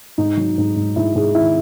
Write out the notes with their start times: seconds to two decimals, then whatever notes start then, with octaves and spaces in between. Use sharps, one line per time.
0.18 G#2 D#4
0.37 F#3
0.58 G#2
0.76 G#2
0.96 G#2 E4
1.15 G#2 G#4
1.35 D#3 E4